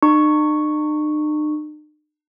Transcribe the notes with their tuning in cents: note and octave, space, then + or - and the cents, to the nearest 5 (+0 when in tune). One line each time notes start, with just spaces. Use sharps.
D#4 -45 C#6 +0